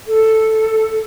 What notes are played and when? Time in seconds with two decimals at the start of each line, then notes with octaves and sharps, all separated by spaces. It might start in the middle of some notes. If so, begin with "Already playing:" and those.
0.07 A4